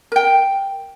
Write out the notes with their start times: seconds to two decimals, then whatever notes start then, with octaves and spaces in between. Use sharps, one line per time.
0.12 A#4 G5